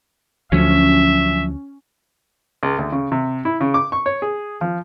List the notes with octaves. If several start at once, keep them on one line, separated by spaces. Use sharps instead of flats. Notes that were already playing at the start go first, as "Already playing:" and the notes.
D2 F3 F#3 C#4 E5
C#2
D2
C#3
C3
E4
C#3
D6
C#6
C#5
G#4
F3